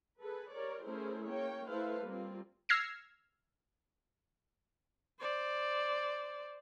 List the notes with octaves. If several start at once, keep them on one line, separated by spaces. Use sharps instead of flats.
G#4 A4 B4
G4 A#4 C#5 D5
A3 C#4 E4 G#4 A#4 C5
A#3 C#4 C#5 G5
A3 E4 A4 B4 C5 F5
G3 A#3 C4 F4
E6 F6 G#6 A#6 C7 C#7
C5 D5